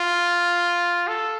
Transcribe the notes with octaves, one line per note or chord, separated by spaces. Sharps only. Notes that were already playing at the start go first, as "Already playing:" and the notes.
Already playing: F4
A4